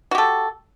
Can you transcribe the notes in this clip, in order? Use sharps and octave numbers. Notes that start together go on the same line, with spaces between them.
F#4 G4 A4